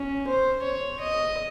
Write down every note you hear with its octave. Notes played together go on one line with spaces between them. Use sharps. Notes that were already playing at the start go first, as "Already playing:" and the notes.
Already playing: C#4
C5
C#5
D#5